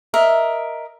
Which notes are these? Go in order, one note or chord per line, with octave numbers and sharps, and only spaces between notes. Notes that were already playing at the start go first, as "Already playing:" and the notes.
A#4 D#5 E5